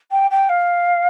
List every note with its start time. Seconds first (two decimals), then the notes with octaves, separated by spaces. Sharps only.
0.11 G5
0.30 G5
0.49 F5